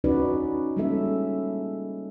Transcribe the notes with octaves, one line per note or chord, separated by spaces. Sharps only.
C#4 D#4 F#4 B4 D5
G3 G#3 A#3 C#4 A4 E5